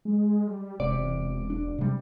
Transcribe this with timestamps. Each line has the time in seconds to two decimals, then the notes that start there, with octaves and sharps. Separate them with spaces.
0.05 G#3
0.47 G3
0.80 E1 C3 D5
1.50 D4
1.78 C3 G3